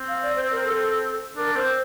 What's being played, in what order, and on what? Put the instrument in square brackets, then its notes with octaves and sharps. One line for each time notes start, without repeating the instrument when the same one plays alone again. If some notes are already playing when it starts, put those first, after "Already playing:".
Already playing: [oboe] C4
[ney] F5
D5
C5
A#4
A4
[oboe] D4 [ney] A#4
[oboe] C4 [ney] C5